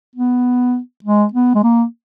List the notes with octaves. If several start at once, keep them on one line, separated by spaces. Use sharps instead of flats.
B3
G#3
B3
G#3
A#3